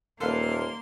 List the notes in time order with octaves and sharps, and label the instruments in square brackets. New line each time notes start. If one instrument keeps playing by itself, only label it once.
[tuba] D#1 [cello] A#3 [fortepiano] A4 B4 F5 [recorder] C6